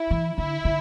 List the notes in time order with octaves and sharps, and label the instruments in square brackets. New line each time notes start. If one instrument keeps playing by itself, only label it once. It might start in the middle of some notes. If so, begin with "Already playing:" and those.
Already playing: [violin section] E4
[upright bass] E3
[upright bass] D3 [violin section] E4
[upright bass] D3